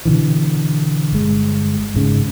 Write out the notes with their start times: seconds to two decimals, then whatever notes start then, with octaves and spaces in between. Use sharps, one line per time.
0.05 B2 D3 E3
1.13 G1 G#3
1.94 G#1 G#2 C#3